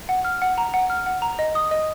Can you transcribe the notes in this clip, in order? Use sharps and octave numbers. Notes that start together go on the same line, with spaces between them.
F#5
F6
F#5
A#5
F#5
F6
F#5
A#5
D#5
D#6
D#5